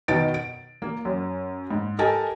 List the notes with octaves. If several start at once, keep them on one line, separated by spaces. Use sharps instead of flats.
B2 D#3 D#4 B4 A6 D7
D7
A#3
F#2
G#2
G4 A4 A#4 D#5 G#5 A5